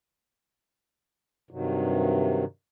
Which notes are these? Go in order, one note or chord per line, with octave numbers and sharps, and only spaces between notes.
G2 C3 D#3 F#3